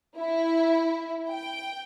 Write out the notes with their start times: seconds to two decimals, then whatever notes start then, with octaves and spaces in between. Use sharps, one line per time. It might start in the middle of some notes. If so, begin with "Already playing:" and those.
0.17 E4
1.29 G5